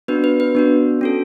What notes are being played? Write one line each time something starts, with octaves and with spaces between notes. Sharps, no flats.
B3 D4 F#4 B4
B4
B4
B3 D4 F#4
C#4 F#4 A4